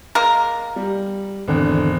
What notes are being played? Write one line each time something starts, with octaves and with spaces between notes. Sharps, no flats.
G#3 A#3 A#4
G3
G#1 E2 D3